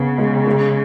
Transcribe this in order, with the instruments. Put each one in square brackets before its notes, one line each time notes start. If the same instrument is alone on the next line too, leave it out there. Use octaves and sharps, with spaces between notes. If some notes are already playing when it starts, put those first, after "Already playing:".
Already playing: [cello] C#3 [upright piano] B3
[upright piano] G#3
G#3